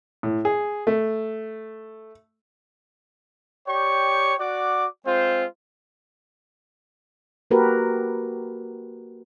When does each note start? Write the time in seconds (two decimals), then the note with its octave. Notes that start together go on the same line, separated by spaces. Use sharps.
0.23 A2
0.45 G#4
0.87 A3
3.68 G4 C#5 D5 G5 C#6
4.39 F#4 D5 F#5 D6
5.06 G#3 C4 F4 C5
7.51 A#3 F#4 G4 A#4 B4